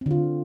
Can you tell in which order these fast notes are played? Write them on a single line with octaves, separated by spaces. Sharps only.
C4 D3 F4